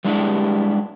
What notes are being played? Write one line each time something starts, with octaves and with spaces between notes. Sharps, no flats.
G3 G#3 D4 E4 G4